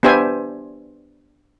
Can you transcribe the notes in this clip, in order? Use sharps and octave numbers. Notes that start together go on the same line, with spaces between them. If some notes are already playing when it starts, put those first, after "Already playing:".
B3 D4 G4 C5 E5 G#5